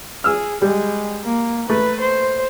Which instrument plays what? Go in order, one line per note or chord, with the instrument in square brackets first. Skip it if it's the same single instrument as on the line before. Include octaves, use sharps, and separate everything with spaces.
[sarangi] G#4 [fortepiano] E6 F6
[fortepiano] G3 [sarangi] G#3
[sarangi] A#3
[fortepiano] A3 [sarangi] B4
[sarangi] C5